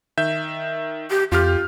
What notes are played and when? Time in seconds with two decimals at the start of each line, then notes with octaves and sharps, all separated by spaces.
0.17 D#3 E5 G6
1.10 G4
1.32 F2 F4 G4 F6